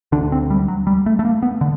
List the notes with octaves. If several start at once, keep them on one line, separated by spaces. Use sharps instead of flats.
D2 D3 D4
C4
G3
F#3
G3
A3
A3
A#3
B3
D3